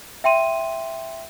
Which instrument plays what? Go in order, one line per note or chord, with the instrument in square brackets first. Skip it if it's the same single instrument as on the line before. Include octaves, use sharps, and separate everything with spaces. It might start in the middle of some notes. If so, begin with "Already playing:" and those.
[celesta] E5 G5 C6 D#7